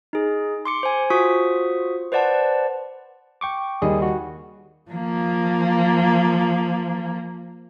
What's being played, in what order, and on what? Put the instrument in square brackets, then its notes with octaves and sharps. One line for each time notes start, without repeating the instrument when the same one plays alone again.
[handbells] D#4 G#4
C6 D6 C#7
C5 G#5
F4 F#4 C5 C#6 D#6 B6
B4 C5 D5 F#5 A5
[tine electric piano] G5 C#6 D6
[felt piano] D#2 G3 D#5 [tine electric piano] G#4
[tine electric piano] F#4
[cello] F3 A#3